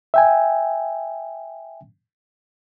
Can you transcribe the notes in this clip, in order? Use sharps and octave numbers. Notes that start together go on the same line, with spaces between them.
E5 G5 G#5